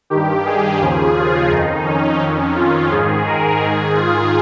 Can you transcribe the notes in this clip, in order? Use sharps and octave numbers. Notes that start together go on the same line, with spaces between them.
G2 D#3 G4
G#4
D#2 C#3 F3 G#4
F4
F2 D#3 D#4
C#4
F2 D#3
F4
G#2 D#3 G#4
A#4
G#2 D#3 G#4
F4